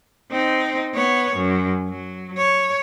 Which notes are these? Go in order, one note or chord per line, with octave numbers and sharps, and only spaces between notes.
C4 D#4
B3 C#5
F#2
F#3
C#5